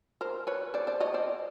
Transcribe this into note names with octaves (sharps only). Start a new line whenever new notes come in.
A#4 C5
B4 C#5
C5 D5
C5 D5
C#5 D#5
C5 D5